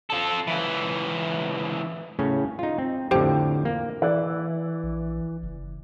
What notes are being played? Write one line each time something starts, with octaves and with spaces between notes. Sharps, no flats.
F4 A4
C#2 E3
A2 C#3 C#4
D#4 F4
C4
F2 A2 D3 G4 C5 G5
A#3
E3 D5
A#1
F#1